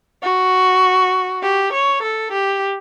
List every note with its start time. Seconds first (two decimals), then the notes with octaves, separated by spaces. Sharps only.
0.22 F#4
1.43 G4
1.73 C#5
2.02 A4
2.32 G4